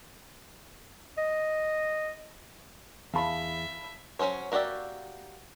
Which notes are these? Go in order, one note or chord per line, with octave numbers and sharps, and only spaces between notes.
D#5
E2 E5 F5 A5 B5
F#3 C#4 A4 C5 C#5
A#3 F#4 G4 D5 E5